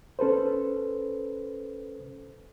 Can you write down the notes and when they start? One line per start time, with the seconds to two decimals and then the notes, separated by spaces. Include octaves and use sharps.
0.19 C#4 A4 B4 C5